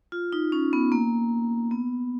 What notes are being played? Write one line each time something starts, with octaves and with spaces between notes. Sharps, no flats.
F4
D#4
C#4
B3
A#3
B3